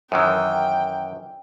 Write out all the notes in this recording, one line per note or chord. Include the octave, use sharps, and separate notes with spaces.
F#2 D#3 E3 G5